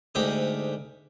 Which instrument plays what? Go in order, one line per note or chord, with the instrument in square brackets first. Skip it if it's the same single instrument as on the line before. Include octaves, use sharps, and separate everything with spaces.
[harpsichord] D2 G#2 G4 G5 D#6